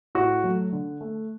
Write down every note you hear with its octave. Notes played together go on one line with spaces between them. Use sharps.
A2 F#4
F#3 A3
D3
A3